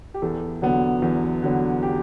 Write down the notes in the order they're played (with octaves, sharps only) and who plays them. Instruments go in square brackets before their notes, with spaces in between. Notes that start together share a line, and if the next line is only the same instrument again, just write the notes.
[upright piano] G4
E2 A4
D3 F#3 B3
E2
D3 F#3 B3
G4